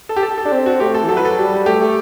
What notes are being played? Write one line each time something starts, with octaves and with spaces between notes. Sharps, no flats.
A4
G4
A4
A4
D4
C4
F#4
A3 G4
A4
E3
F#3 A4
B4
A4
G3
A3 G4
A3